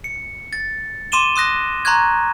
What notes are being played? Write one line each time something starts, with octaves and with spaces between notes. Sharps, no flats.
C#7
A6
C6 D6 D#7 E7 G7
C6 D#6 F#6 A#6
A#5 C6 C#6 F#6 G#6